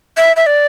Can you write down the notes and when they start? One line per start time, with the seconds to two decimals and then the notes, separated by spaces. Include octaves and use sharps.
0.17 E5
0.36 E5
0.46 D5